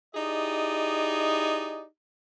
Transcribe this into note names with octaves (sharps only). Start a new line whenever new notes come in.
D#4 E4 G4 G#4 D5 D#5